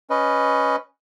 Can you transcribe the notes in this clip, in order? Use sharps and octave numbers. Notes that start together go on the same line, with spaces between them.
C#4 B4 D#5